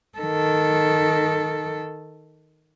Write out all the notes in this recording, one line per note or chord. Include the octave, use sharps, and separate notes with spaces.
D#3 A4